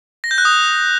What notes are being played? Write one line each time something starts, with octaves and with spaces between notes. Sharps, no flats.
A#6
G6
F#6
D#6